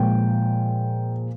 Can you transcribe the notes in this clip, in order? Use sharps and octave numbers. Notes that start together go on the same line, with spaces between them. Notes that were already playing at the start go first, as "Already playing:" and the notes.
Already playing: A#2 F3 G#3 G5